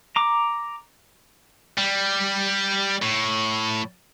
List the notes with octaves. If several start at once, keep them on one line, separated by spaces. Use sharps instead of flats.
A#5 D6
G3
A2